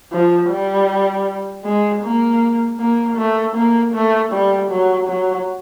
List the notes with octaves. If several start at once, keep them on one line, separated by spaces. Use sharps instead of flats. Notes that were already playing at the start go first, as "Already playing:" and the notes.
F3
G3
G#3
A#3
A#3
A3
A#3
A3
G3
F#3
F#3